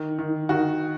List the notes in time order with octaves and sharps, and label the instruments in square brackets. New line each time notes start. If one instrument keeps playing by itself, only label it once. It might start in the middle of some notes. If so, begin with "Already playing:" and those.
Already playing: [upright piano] D#3
D#3
D#3 F#4